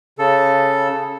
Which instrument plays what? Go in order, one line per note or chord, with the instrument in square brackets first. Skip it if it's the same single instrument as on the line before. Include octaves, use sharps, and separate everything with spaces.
[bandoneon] C#3 A4